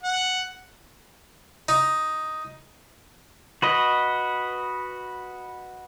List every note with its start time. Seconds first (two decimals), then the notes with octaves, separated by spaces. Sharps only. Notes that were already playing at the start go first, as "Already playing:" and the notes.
0.03 F#5
1.69 D#4
3.62 F#4 B4 D#5